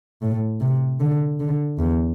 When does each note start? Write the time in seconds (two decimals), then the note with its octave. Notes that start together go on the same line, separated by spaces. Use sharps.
0.22 A2
0.61 C3
1.00 D3
1.40 D3
1.78 E2